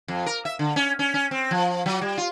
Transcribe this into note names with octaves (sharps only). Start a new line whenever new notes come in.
F2
A#4
E5
D3
C#4
C#4
C#4
C4
F3
F#3
G3
F4